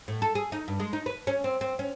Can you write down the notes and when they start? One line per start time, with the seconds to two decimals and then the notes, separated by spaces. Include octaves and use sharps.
0.08 A2
0.22 A4
0.35 G#4
0.52 D#4
0.68 G2
0.80 G#3
0.93 D#4
1.06 B4
1.27 C#4
1.44 C4
1.61 C4
1.79 C#4